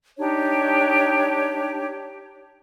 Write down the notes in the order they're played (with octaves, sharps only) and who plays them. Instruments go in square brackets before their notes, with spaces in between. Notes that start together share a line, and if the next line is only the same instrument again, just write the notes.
[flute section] D4 D#4 G4 C#5